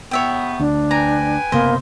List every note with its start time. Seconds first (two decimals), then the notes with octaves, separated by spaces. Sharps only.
0.11 A2 C3 B3 C#5 E5 G5
0.59 D2 D4
0.91 B4 G5 G#5 A#5
1.52 F#1 C3 A#3 B3 C5 D#5 E5